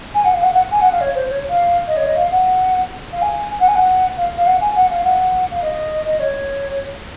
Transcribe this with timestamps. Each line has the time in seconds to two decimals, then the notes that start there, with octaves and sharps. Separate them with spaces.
0.14 G#5
0.24 F#5
0.34 F5
0.43 F#5
0.53 F#5
0.71 G#5
0.81 F#5
0.92 F5
1.01 C#5
1.15 C5
1.30 C#5
1.49 F5
1.87 D#5
1.97 C#5
2.07 D#5
2.16 F5
2.31 F#5
3.13 F5
3.22 G#5
3.60 F#5
3.68 G#5
3.76 F#5
4.17 F5
4.36 F5
4.46 F#5
4.61 G#5
4.76 F#5
4.90 F5
5.04 F#5
5.51 F5
5.62 D#5
6.08 D#5
6.20 C#5